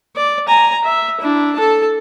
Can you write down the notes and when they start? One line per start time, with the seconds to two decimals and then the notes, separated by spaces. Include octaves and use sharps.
0.16 D5
0.48 G#5 A#5
0.84 E5
1.21 D4 E4
1.55 A4 A5